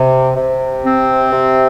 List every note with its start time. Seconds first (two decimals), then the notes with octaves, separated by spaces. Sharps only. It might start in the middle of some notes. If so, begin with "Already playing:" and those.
Already playing: C3
0.37 C3
0.84 C4
1.31 C3